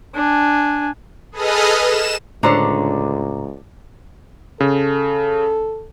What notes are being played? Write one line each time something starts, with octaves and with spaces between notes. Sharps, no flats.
D4 G#5
G#4 A4 B4 D#5 D#6 F6
E7
C#2 A2 D3 D4 C5 C#5 A#5
C#3 A4